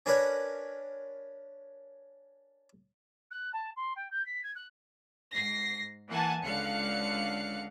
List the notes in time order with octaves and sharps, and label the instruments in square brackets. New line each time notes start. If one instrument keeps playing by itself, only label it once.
[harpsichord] C#4 D4 A#4 B4 C#5
[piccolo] F#6
A5
C6
G5
G6
B6
G#6
F#6
[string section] G#2 A#6 C7
E3 A#3 F#5 G#5 A5
C#2 D3 F5 F#6 C#7